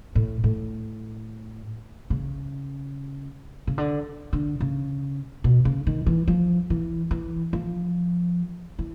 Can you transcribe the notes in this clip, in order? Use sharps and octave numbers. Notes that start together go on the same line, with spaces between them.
A2
A2
C#3
C#3
D3
D3
C#3
B2
C#3
D#3
E3
F3
E3
E3
F3
E3